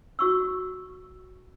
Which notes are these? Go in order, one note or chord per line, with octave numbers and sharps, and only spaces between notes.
F#4 C#6 E6